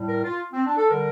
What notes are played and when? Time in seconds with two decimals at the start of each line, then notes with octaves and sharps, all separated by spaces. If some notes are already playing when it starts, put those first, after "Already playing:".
Already playing: A2 G3
0.09 A#4
0.24 F4
0.53 C4
0.66 D4
0.78 A4
0.90 D3 G3 A#4